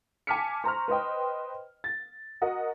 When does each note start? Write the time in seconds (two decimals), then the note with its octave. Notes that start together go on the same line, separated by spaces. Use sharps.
0.27 G#5 A5 D6 F6 B6 C#7
0.64 C5 A#5 C#6 F6
0.88 B4 C5 D#5 G5
1.84 A6
2.42 F#4 A#4 D#5 F#5